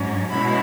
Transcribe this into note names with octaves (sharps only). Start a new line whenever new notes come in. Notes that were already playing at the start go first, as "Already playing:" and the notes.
Already playing: G#2 F#3 C#4
B2 G#3 C#4 E4 B5